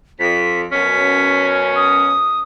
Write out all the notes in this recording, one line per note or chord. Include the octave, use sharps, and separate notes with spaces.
F2 B6
F#2 B2 C#4 B6
D#6